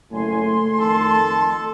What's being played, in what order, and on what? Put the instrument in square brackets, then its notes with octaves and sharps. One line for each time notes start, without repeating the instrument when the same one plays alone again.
[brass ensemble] F#1 A2 G#5 [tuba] A3 [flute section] C6
[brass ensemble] F2 D#3 A5 [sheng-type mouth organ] A4